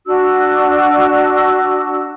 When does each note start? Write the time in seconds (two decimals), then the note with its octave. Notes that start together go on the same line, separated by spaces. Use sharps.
0.06 D4 F#4 E6